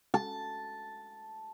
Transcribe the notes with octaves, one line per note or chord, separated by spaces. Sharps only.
A5